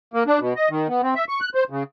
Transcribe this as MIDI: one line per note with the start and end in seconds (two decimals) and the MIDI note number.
0.14 0.23 58
0.27 0.39 62
0.40 0.54 47
0.56 0.69 75
0.70 0.88 51
0.88 1.02 59
1.03 1.14 60
1.15 1.25 76
1.29 1.40 85
1.41 1.49 90
1.55 1.64 72
1.70 1.83 49